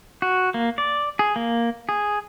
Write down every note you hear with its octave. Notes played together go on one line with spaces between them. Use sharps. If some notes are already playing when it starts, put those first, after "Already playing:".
F#4
A#3
D5
G#4
A#3
G#4